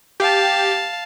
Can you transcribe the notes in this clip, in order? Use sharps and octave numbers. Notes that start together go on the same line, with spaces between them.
G4 F5 A5